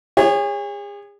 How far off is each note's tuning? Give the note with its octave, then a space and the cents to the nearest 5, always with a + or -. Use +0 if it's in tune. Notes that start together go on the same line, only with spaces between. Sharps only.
G#4 -40 C#5 +0